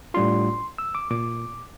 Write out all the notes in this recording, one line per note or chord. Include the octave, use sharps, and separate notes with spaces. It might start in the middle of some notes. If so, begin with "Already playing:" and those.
A2 G3 D4 F4 C6
E6
D6
A#2 D6